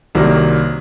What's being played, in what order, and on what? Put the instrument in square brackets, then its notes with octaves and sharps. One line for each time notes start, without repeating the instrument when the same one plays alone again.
[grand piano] C2 C3 D#3 F#3 A#3